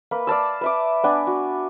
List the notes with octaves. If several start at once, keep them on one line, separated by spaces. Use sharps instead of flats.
A#3 B4
D5 F5 A5 E6
B4 E5 D6
B3 D4 G#5
F#4